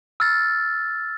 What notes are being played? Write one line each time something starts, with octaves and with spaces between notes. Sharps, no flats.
E6 F6 A6